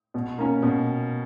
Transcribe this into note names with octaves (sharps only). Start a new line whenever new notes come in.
B2
A#3 C#4
B2